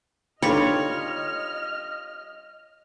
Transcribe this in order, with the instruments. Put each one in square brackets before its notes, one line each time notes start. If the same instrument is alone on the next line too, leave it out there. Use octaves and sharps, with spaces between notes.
[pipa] G3 F4 [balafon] D4 D#4 A4 [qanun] C#5 [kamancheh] D#5 F6